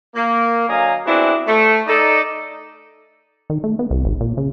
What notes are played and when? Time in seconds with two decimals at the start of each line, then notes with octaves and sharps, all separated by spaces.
0.15 A#3
0.69 D3 F#3 D#5 F5 G#5 A#5
1.06 B3 C4 D4 E4 F#4 G#4
1.47 A3
1.87 D#4 A4 D5
3.50 D#3
3.64 A3
3.79 B3
3.90 C2
4.05 G#1
4.21 A#2
4.37 C#3